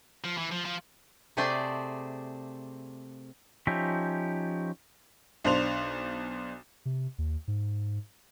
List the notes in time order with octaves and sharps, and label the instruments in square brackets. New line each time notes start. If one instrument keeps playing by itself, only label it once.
[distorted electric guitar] F3
E3
F3
F3
[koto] C3 A3 G#4 C5 D5 A5
[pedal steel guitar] F3 C#4 D#4 G4 E5
[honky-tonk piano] B1 D4 C5 F7
[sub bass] C3
D#2
G#2